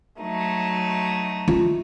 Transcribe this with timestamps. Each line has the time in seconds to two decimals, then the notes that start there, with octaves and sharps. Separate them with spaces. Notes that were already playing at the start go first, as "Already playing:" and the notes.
0.21 F#3 A3 D#4
1.48 F4